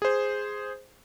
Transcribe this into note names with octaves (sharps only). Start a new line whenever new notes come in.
G#4 C5